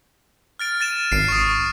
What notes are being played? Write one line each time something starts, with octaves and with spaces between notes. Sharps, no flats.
F6 A6 D7
A6 D#7 E7
G#1 C7 D7
C#6 D#6